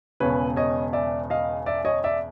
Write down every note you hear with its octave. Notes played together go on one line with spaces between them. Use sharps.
E1 E2 C#3 B4 C#5
C#5 D#5
D5 E5
D#5 F5
D5 E5
C#5 D#5
D5 E5